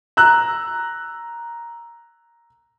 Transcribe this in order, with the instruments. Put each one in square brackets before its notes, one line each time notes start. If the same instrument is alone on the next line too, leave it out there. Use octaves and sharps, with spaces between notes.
[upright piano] A#5 E6 F#6